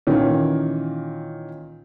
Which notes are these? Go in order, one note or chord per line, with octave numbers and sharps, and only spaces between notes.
A#2 D#3 E3 C#4